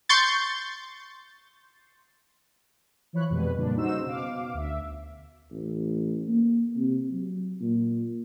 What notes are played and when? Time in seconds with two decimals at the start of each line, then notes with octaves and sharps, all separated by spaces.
0.09 C6 C#6 G6 A6
3.13 E3 F3 C#5 B5 F#6
3.30 F2 B2 G3 G#3 B4
3.57 A#2 C#3 G3 D4
3.76 C#3 D#4 F#4 C5 E6 E7
4.07 B2 F5 D6
4.54 D2 E5
5.51 A1
6.28 A#3
6.76 C3
7.11 F#3
7.61 A#2